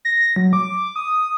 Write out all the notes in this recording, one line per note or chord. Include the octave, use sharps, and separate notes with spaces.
A#6
F#3
D6
D#6